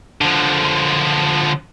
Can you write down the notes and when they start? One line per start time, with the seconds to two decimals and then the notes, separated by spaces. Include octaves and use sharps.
0.21 D3 F3